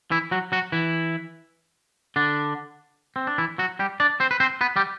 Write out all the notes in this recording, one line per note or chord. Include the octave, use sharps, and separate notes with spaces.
E3 E4
F#3 F#4
F#3 F#4
E3 E4
D3 D4
C4
D4
E3 E4
F#3 F#4
G3 G4
D4 D5
C4 C5
B4
C4 C5
B3 B4
G3 G4